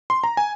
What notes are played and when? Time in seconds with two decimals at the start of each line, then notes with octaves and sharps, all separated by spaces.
0.10 C6
0.24 A#5
0.37 G#5